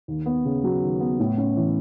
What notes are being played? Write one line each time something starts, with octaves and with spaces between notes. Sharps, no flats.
D#2
B3
C#3
F#3
D#2
B3
A2
C#4
E3